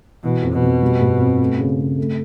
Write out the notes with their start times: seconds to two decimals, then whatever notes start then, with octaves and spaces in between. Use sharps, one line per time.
0.23 B2 E3
0.42 F2
0.52 B2
0.62 F2
0.82 G3
1.01 G2
1.20 C4
1.40 A3
1.59 C#3
1.79 C#3
1.98 A3